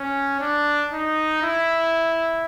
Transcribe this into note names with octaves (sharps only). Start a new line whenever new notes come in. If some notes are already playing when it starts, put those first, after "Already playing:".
Already playing: C#4
D4
D#4
E4